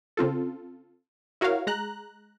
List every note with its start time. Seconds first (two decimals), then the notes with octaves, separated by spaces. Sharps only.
0.17 C#3 C4 F4 A4
1.41 E4 F#4 A#4 C#5 F5
1.67 G#3 A#5 F#6